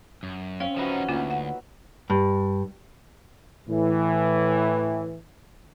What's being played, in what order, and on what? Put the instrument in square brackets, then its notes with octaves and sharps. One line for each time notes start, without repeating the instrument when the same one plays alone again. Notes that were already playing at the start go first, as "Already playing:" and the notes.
[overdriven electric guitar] F#2
[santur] C4 [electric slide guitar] C#4 [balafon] F5
[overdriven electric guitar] F3 D#4 [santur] F#3 B4 E5
[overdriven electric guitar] D2 [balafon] A#3 F4 F#5 [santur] D#4 E5
[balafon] F#5
[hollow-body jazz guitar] G2
[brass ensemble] A2 E3